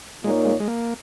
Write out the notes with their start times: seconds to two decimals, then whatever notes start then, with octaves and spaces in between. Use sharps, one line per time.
0.23 A#2 G#3 A#3 D#4 A#4 C#5
0.45 G#3
0.60 G#3
0.68 A#3